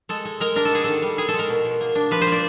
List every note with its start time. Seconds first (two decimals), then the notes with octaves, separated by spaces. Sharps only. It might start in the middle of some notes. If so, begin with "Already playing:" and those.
0.09 G#3 A4
0.25 G#3
0.40 G#3 A#4
0.56 D4 A#4
0.65 A4
0.71 B3 G#4
0.84 D#3 A4
1.02 G3
1.18 G#3 G#4
1.28 A4
1.34 G#3
1.39 A#4
1.49 B2
1.65 B2
1.80 A#3
1.95 D4
2.11 F3 B4
2.21 C5
2.27 A#3
2.32 D5